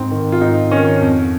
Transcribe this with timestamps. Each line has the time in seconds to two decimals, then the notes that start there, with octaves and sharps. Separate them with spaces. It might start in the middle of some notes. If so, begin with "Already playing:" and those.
Already playing: G#2 C4
0.11 D#3
0.32 F4
0.41 G#2 D#4
0.71 D#3 C#4
1.01 F2